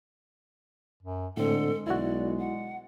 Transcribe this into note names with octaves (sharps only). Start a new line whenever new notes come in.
F#2
A2 D3 G#3 C4 A4
B1 E4 F#4 D5
F#5